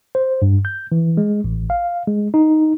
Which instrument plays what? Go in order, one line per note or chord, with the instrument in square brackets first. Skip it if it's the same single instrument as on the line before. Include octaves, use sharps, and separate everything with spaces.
[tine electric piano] C5
G2
G6
E3
G#3
A1
F5
G#3
D#4